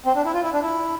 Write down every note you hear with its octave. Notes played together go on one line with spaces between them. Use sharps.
C4
D4
E4
F4
E4
D4
E4